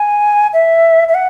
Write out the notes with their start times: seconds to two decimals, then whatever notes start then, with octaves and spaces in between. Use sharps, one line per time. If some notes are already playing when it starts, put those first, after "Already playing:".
Already playing: G#5
0.53 E5
1.08 E5
1.14 F#5